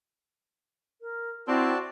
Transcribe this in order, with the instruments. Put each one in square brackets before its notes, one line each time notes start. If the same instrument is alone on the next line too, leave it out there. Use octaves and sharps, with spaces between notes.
[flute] A#4
[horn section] C4 [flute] E4 [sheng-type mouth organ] F#4 D5 A5